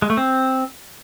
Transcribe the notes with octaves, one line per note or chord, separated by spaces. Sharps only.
G#3
A3
C4